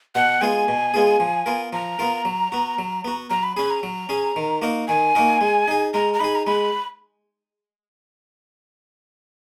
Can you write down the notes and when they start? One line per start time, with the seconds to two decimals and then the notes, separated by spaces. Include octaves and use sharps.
0.15 B2 F#5
0.41 G#3 B3 F4 G#4 G#5
0.68 B2
0.94 G#3 B3 F4 G#4
1.20 F3
1.46 B3 F4 A#4
1.73 F3 A#5
1.99 B3 F4 A#4
2.25 F#3
2.52 B3 F#4
2.78 F#3
3.04 B3 F#4
3.30 F#3 A#5
3.43 B5
3.57 C#4 G#4 B5
3.70 A#5
3.83 F#3
4.09 C#4 G#4
4.36 D#3
4.62 A#3 D#4 F#4 A#4
4.88 D#3 G#5
5.15 A#3 D#4 F#4 A#4
5.41 G#3
5.68 D#4 G#4
5.94 G#3 A#5
6.14 A#5
6.20 D#4 G#4 B5
6.35 A#5
6.46 G#3 B5